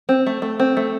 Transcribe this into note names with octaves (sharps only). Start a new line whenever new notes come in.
C4
A3
A3
C4
A3